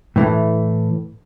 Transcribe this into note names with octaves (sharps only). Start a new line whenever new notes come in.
A2 E3 A3